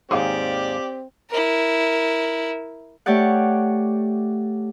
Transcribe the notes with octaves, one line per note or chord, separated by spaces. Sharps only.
D#2 G#2 C4 G4 G#4 D5 F5 D6
E4 A#4
A3 G4 C#5 D5 F#5